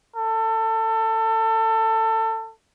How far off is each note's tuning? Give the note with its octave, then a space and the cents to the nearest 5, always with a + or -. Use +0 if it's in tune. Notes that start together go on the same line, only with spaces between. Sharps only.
A4 +25